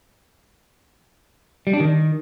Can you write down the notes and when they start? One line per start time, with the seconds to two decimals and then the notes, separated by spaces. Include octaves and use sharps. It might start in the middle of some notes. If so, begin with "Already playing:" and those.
1.67 G3
1.73 D4
1.80 D#3